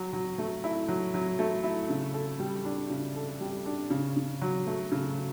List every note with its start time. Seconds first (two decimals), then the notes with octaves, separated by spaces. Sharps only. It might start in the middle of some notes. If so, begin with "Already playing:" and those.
Already playing: F#3
0.13 F#3
0.38 A3
0.64 E4
0.88 F#3
1.14 F#3
1.39 A3
1.64 E4
1.90 C#3
2.14 A4
2.40 G3
2.65 D4
2.90 C#3
3.16 A4
3.41 G3
3.66 D4
3.90 C#3
4.17 C#3
4.42 F#3
4.67 A3
4.92 C#3